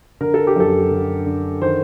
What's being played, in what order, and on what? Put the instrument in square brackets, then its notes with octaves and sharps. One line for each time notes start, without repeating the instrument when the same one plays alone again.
[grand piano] D3 A#4
A4
G4
F#2 A4
D3
D3
D#3 C5